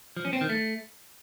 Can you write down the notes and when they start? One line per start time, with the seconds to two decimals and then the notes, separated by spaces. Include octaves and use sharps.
0.17 F3
0.25 C#4
0.33 C4
0.41 D#3
0.49 A3